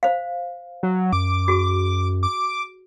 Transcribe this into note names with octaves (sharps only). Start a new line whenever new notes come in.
C5 F5
F#3
F#2 D6
F#4 G#4
D6